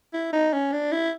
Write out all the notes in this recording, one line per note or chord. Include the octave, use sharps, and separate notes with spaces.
E4
D#4
C#4
D4
E4